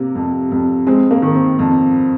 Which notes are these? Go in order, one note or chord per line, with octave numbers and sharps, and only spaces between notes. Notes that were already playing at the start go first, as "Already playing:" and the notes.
Already playing: C3 A#3
F2
F2
G#3 C4
A#3
D#3
C4
F2